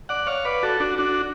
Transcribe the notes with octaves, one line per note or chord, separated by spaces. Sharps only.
D5 F#5
C#5 F5
B4 D5
F#4 A4
D4 F#4
D4 F#4